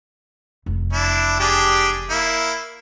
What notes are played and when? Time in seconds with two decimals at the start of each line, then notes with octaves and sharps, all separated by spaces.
0.66 F1 E2
0.93 D4 E4
1.40 D4 G4 G#4
2.10 A#3 E4